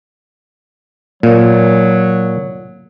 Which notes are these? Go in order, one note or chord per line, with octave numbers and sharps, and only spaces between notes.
A#2 F#3